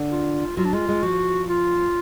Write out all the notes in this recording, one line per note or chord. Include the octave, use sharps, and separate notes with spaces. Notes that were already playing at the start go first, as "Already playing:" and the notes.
Already playing: D3
F4
F#3 F4
D4
G#3 F4
G#3
F3 F#4
F4